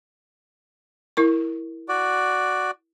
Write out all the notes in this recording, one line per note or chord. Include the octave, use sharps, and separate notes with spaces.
E4 A#4 C#6
F#4 D5